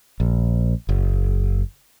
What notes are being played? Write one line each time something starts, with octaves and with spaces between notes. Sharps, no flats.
A#1
F#1